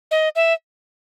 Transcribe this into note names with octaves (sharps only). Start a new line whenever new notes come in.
D#5
E5